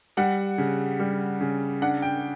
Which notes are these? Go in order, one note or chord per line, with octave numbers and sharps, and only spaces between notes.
G3 F#5
C#3
G3
C#3
D4 F#5
G5